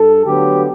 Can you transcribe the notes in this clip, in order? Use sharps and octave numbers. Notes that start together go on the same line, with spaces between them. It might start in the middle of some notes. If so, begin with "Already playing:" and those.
Already playing: G2 A4
D2 D3 F#3 B3 G4